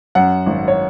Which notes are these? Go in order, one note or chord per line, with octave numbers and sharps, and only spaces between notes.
F#2 F#5
G#1
C#5